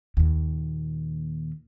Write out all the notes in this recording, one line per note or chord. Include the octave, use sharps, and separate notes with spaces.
D#2 A#2